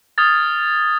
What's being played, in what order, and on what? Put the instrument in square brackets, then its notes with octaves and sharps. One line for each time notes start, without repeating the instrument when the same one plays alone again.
[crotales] D#6 F6 G#6 A6